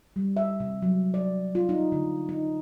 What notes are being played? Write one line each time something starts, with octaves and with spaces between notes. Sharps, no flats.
G3
E5
C3
F#3
D5
F4
D#4
D3
D#4